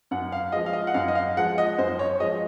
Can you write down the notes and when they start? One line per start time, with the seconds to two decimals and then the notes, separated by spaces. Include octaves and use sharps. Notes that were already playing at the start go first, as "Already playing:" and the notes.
0.11 F#2 F#5
0.32 F5
0.52 F3 G#3 D#5
0.66 F5
0.73 D#5
0.87 F#5
0.94 F#2 F5
1.08 D#5
1.15 F5
1.37 F3 G#3 F#5
1.58 D#5
1.78 F#2 C5
1.99 C#5
2.20 F3 G#3 D#5